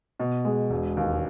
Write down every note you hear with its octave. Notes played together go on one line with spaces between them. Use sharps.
B2
G#3
E1
D#2